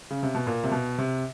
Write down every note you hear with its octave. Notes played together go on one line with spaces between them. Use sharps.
C#3
C3
B2
A#2
C3
B2
C3